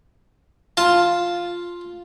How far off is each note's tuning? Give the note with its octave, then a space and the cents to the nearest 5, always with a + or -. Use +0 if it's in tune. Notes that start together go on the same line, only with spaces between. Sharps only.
F4 +0 A5 +0